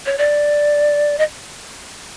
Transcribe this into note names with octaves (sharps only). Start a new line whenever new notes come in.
C#5
D5
D#5